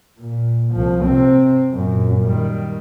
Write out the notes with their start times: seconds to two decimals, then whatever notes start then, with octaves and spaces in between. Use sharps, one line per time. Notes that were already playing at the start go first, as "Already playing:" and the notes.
0.20 A#2
0.74 C2 F3
1.06 C3 C4
1.72 F#2 A#2
2.25 D#3 G3